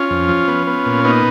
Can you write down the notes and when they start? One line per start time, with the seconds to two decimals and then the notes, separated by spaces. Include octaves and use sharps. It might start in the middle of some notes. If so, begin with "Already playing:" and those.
Already playing: C#4 F4
0.10 F2
0.28 F3
0.48 B3
0.67 B3
0.86 A#2
1.04 B3 D#4